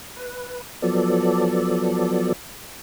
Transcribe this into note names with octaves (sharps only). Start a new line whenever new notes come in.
B4
F3 F#3 B3 A4 D5